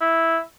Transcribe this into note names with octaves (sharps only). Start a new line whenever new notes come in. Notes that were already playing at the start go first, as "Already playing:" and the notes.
E4